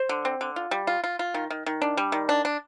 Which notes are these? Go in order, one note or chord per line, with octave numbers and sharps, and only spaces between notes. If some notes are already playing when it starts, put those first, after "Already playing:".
Already playing: C5
D3
C4
D3
F4
G3
F4
F4
F4
D#3
D#3
D#3
D4
G3
D#3
D4
D4